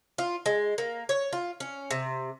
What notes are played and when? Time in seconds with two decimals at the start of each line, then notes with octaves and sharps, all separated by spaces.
0.18 F4
0.46 G#3
0.78 A#3
1.09 C#5
1.33 F4
1.60 C#4
1.91 C3